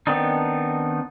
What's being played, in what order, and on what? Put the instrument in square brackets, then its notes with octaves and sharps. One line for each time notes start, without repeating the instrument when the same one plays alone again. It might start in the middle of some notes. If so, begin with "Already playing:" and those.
[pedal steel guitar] D#3 B3 C4 D4 D#4